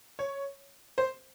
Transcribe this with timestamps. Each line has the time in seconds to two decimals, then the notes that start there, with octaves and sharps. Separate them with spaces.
0.19 C#5
0.98 C5